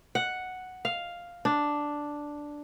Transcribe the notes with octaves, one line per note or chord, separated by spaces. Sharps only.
F#5
F5
D4